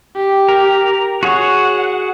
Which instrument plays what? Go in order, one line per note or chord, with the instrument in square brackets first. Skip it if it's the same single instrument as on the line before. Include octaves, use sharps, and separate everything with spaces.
[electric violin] G4
[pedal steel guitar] A#4
[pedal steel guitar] F#4 G#4 C#5 [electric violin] F#5